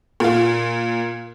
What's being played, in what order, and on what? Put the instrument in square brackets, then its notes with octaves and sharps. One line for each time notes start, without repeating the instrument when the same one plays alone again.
[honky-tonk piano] A#2 F4